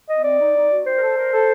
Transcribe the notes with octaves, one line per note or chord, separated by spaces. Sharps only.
D#5
C4
D5
D#4
D#4
F#4
G4 C5
A#4
A4
A#4
A4